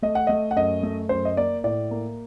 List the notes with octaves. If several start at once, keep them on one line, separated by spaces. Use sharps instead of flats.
A3 D#5
F#5
A3 D#5
F#5
F#2 D#5
A3
F#2 C5
D#5
A#3 D5
A2 D5
A#3